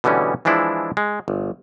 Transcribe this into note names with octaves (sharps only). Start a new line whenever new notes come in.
B2 D3 E3 G3 C#4
E3 F3 G#3 D4 E4
G#3
G1